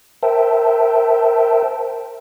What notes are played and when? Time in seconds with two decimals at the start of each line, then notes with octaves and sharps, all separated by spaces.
0.23 A#4 C5 E5 G5 A5